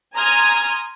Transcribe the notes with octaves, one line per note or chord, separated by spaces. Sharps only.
G#5 A#5 C6 D#6 F6 G#6